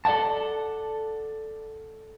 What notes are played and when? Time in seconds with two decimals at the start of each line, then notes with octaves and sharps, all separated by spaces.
0.05 A4 D5 E5 F#5 A5